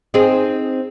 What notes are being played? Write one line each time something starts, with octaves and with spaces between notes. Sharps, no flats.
C4 D#4 G#4